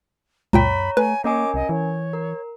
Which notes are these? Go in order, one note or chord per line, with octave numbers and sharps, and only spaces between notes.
C#2 F#2 A#2 C#5 G5 A#5 B5
A3 B4 G#5
A#3 C#4 A#4 C#5 D#5 G#5 D6
C2 D#5
E3 C#5
A#4